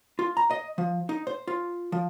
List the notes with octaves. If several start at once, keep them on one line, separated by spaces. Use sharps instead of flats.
F4
A#5
D#5
F3
D#4
C5
F4
F3